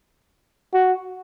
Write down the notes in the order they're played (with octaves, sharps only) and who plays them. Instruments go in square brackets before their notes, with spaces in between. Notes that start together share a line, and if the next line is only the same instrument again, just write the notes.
[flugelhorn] F#4